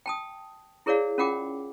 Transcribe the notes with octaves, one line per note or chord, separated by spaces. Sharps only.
G5 A5 D#6
E4 G#4 A#4 C#5 D5 F5
C#4 F4 A#4 F#5 G5 D6